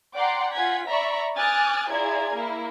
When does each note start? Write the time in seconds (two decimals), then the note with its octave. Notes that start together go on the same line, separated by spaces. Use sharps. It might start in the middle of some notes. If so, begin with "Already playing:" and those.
0.16 D5 F#5 G5 A#5 C6 D6
0.54 F4 F#5 G#5 G#6 B6
0.88 D5 E5 A#5 B5 C#6
1.37 G#5 D6 D#6 F6 F#6 A6
1.90 E4 F4 G#4 D5 A#5 G#6
2.32 A#3 E4